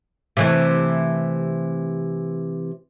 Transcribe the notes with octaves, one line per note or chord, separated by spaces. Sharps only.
C3 E3 A3